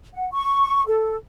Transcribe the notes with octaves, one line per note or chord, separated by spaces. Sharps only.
F#5
C#6
A4